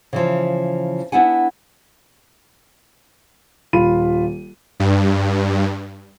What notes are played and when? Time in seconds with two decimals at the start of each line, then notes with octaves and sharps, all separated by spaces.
0.13 C#3 E3 F3
1.12 B3 D4 E4 F#5 G#5
3.73 D#1 F4 B5 D#7
4.80 G2